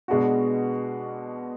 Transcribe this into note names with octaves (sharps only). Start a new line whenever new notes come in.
B2 G#3 B3 D4 F#4